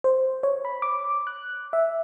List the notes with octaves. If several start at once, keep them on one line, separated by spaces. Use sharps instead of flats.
C5
C#5
B5
D6
F#6
E5